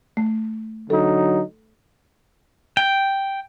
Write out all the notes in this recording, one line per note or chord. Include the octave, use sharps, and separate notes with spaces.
A3
D3 F#3 D#4 A4
G5